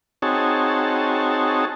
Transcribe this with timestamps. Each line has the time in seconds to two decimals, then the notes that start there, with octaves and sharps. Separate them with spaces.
0.22 C4 D#4 F#4 G#4 C#5 A5